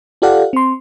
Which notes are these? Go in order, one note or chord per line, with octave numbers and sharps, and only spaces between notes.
F4 G4 A4 D5 F5 F#5
C4 C6